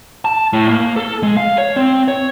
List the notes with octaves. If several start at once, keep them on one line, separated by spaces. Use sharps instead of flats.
A5
A2
A#3
A4
G#3
F5
C#5
C4
C#5